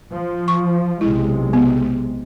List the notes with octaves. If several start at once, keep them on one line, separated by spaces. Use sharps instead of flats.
F3
C#6
B1 C3 G#3 E4
B3